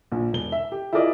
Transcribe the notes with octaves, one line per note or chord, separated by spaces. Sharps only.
A#1
E1 G7
E5
G4
E4 F4 G#4 A#4 D5 D#5